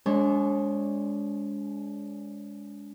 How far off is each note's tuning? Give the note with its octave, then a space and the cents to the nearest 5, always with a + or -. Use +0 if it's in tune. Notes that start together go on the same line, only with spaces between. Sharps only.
G#3 +0 D4 -40 C#5 -40